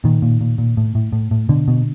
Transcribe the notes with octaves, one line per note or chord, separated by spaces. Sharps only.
A#2 D#3
A#2
A#2
A#2
A2
A2
A2
A2
B2 D3
B2